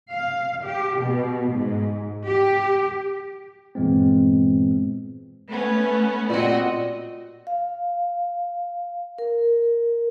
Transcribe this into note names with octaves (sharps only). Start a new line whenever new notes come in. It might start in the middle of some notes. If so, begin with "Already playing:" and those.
F5
G4
B2
G#2
G4
G2 A#2 E3 G#3 B3 C4
A3 B3 C#4
A#2 C4 F#4 D#5
F5
A#4